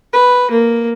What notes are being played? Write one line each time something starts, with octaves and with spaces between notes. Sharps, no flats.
B4
A#3